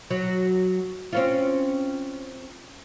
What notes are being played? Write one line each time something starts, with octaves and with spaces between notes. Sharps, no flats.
F#3
C4 C#4 F4